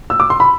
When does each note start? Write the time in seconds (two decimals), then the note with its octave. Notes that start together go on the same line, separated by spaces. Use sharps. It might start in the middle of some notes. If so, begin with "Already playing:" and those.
0.10 E6
0.20 D6
0.30 C6
0.40 B5